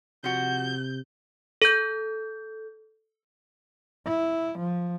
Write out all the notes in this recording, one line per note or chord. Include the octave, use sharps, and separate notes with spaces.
C3 F3 F#4 G6
A4 G6
E4
F3